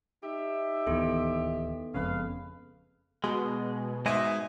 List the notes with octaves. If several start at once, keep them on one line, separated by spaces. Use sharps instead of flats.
D#4 G4 E5
D1 D#2 E3 B3 A4
F#1 F2 C#3 G#3 B4 F5
B2 G#3
G#2 G#3 G#4 D#5 E5